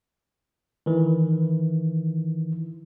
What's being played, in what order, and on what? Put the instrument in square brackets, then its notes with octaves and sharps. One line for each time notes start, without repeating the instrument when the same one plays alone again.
[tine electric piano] D#3 E3